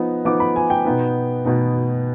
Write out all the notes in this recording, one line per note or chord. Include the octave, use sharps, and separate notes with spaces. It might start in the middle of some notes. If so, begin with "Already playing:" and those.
Already playing: F3 B3 D#4
F3 B3 D#4 D6
B5
G#5
G5
B2 B3 D#4
B2 B3 D#4